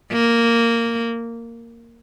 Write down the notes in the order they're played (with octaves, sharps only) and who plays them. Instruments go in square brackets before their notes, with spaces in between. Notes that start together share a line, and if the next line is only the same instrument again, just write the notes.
[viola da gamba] A#3